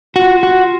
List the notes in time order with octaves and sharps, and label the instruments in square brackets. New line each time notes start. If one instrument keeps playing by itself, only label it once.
[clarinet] F4 [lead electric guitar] F#4
[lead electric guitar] F#4